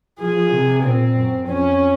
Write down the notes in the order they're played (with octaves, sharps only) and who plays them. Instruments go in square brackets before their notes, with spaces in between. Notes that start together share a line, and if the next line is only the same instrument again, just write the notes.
[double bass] F3 [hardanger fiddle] G#4
[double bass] C3
[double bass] A#2 [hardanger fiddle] C4
[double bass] F#2
[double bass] F2 [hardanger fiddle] C#4